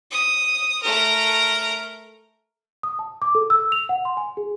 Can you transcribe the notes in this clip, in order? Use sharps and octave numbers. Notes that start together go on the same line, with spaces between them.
D#6
A3 A#4
D#6
A5
D6
A4
E6
F7
F#5
C6
G#5
G#4